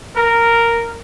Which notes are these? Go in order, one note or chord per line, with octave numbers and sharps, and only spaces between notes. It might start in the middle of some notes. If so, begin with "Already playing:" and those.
A#4